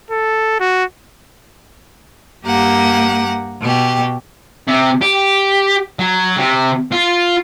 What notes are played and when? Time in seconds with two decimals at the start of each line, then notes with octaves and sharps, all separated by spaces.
0.11 A4
0.60 F#4
2.44 G2 A#3 G4 F#5 A#5
3.61 B2 G4
4.67 C3
5.01 G4
5.99 F#3
6.37 C3
6.92 F4